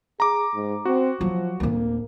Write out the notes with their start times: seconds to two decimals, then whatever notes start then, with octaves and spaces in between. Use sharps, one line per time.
0.20 G#4 A#5 D6
0.54 G#2
0.85 C4 F#4
1.21 F3 F#3
1.60 D1 D2 A#3